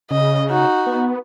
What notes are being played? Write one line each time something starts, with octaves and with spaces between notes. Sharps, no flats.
C#3 D#5
D#4 F#4
B3